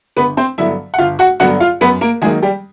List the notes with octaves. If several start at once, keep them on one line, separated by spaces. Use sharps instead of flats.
G1 B3 B4
C4 C5
G2 D3 F#3 B3 E4 E5
F#5
G1 F4 F5
F#4 F#5
G2 D3 F#3 B3 F#4 F#5
F4 F5
F#2 B3 B4
A#3 A#4
D#3 F#3 G#3 A#3 D#4 G#4
G3 G4